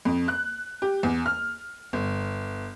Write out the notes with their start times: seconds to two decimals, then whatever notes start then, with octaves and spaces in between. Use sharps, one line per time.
0.05 F2
0.28 F#6
0.82 G4
1.03 E2
1.26 F6
1.93 G1